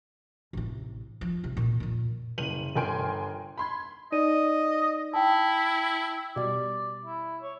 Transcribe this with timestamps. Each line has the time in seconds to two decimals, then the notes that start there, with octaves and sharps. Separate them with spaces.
0.53 A1 C3
1.21 F3
1.44 C3
1.57 A#2
1.80 F2 A#2
2.38 F#1 D#7 F#7
2.76 G1 A#4 G5 G#5 C6 D7
3.58 B5 C6 G#6
4.12 D#4 D5 D#5 D#7
5.14 E4 G5 A5
6.36 B2 G3 D5
7.05 E4
7.42 C#5